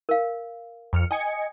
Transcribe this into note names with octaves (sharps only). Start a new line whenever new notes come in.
A#4 F5
F2 F6 C#7
D#5 G5 G#5 C#7